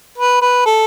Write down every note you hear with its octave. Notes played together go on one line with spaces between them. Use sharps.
B4
B4
A4